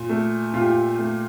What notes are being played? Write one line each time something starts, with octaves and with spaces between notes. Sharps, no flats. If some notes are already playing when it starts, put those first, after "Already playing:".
Already playing: A#2
A3
A#2 F4
G4
F4
A3